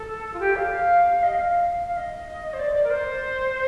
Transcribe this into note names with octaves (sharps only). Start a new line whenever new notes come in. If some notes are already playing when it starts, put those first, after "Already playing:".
Already playing: A4
F4
G4
F5
F5
D#5
F5
F5
D#5
C5
D5
D5
A#4
C5